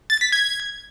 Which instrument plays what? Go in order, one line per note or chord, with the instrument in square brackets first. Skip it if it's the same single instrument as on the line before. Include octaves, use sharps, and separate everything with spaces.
[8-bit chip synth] A6
B6
G#6